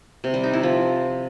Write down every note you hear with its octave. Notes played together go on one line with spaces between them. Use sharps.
C3
G3
D#4
E4
F3